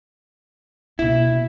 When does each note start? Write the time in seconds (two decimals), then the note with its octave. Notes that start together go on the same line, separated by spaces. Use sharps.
0.99 B2 A#3 E4